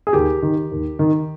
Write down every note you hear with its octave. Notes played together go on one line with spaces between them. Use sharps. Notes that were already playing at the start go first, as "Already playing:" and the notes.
G#4
D#2 G4
D#3
D#2
D#3